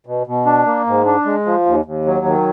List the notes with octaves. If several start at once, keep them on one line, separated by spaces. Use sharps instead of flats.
B2
B2
D4
A#3
G#2
D4
G#3
F3
D#2
D#2
F#3
D#3